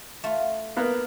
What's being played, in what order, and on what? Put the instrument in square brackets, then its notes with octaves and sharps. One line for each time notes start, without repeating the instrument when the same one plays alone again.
[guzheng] A3 F4
[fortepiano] A#3 B3